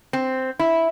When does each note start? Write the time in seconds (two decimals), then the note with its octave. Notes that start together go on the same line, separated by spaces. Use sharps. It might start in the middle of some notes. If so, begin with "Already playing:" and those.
0.13 C4
0.59 E4